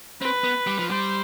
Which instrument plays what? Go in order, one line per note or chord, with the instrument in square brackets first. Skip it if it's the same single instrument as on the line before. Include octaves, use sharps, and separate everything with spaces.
[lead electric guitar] C4 [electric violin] B4
[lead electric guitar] B3
G3
F3
[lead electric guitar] G3 [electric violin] C5